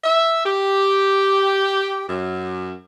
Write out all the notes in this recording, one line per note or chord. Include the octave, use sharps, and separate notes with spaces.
E5
G4
F#2